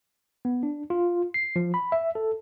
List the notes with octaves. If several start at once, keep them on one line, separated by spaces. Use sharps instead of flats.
B3
D4
F4
C7
F3
B5
E5
A4